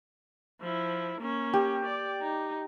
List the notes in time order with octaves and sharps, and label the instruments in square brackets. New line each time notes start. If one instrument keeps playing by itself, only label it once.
[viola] F3 E4
A#3 C#4
[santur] G4
[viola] D5
D#4